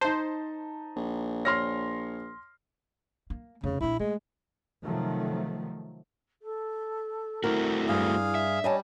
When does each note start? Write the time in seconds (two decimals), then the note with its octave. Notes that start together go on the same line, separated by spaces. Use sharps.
0.01 D#4 C5 A5
0.96 A#1
1.45 C#5 C6 F6 A#6
3.30 A#3
3.64 F1 C#3
3.80 A#1 D4 E4
3.99 G#3 A3
4.83 C3 D#3 F3 F#3 A3
6.42 A4
7.44 A3 C4 E4 F#4 A#4
7.89 G2 G#4 F5
8.35 E5
8.64 G3 C#5 D#5 G#5 A5